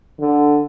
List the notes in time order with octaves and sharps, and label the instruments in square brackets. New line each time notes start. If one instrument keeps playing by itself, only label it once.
[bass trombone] D3